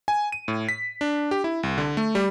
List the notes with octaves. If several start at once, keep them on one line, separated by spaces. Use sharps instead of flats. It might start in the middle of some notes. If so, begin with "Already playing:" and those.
G#5
D#7
A2
B6
D4
G4
E4
C2
D3
A3
G3